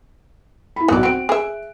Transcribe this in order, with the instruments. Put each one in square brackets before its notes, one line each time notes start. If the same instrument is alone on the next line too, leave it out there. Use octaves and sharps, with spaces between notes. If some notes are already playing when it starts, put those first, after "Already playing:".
[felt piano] E4 B5
[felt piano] B1 F#6 [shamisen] D#4 D5
[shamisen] C4 F#4 [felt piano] D7
[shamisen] G#4 E5